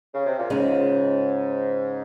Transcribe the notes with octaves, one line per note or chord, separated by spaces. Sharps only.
C#3
C3
A#2
G#2 C#3 G#3 C#4 F4